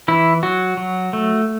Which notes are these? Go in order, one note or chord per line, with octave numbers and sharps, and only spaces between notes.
E3 E4
F#3 F#4
F#3
A3